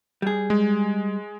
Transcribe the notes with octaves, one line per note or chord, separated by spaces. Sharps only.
G3 G#4
G#3